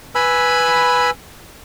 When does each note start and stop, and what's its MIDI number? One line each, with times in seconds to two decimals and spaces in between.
0.15 1.10 71
0.15 1.10 80
0.15 1.10 83
0.15 1.10 88